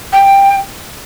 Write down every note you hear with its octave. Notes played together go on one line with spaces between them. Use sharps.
G5